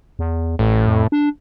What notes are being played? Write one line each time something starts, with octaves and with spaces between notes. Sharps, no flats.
E2
A1 A2
F2
D4